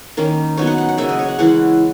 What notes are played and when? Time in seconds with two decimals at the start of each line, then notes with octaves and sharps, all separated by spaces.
0.17 D#3 A#3 C#4
0.57 F#3 B3 D#4 C#5
0.67 F#5
0.78 F#5
0.89 F#5
0.98 C#3 F#3 A#3 E5
1.09 D#5
1.19 C#5
1.28 F#5
1.39 E3 G#3 C#4 E4 F#5